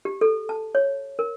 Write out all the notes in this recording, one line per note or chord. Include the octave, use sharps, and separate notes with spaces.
G4
A4
A5
C#5
A#4